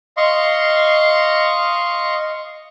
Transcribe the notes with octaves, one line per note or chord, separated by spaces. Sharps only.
D#5 F5 C6 C#6